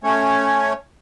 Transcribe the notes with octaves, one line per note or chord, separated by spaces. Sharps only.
A3 C#4 C#5